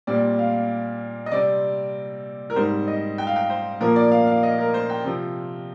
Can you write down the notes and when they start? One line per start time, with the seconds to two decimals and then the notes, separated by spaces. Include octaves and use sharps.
0.07 A#2 G3 C4 D5
0.39 F5
1.26 D#5
1.32 C3 G3 C4 D5
2.50 A#4
2.56 G#2 G3 C4 C5
2.87 D#5
3.18 G5
3.27 F5
3.36 G5
3.50 C5
3.80 A#2 F3 A#3 A#4
3.96 D5
4.11 F5
4.27 F5
4.43 D#5
4.58 A#4
4.74 C5
4.90 G5
5.05 C3 F3 C4